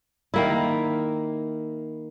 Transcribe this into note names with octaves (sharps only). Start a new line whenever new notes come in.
D#3 A#3 E4